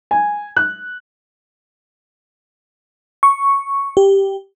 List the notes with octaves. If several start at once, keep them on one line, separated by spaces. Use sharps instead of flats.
G#5
F#6
C#6
G4